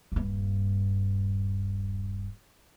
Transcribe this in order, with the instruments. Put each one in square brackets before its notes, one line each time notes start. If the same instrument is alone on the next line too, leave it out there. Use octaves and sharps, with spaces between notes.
[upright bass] D#1 G2